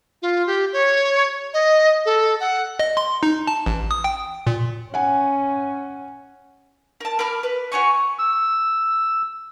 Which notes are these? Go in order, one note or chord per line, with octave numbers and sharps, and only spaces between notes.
F4
G4
C#5
D#5
A4
F#5
D#5
C6
D#4
A5
A1
D#6
G5
A#2
C#4 F#5 G#5
A#4 A5
A#4 B5 D6 F6
B4
F#4 C#5 G#5 C#6
E6